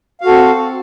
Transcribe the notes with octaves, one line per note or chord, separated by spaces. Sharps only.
C4 F#4 A4 F5